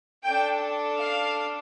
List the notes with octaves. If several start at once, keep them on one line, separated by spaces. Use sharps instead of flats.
D4 A4 G5
F5